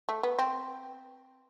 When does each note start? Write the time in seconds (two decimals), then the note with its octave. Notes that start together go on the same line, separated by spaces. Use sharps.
0.09 A3
0.23 B3
0.39 C4